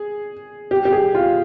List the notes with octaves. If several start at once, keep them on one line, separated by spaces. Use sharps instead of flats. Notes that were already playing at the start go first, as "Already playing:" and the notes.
Already playing: G#4
G4
G4
G#4
F4